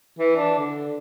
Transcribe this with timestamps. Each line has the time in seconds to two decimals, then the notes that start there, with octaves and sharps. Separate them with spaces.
0.19 E3
0.36 D4
0.59 D3